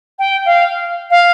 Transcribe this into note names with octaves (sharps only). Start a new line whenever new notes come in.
G5
F5
F5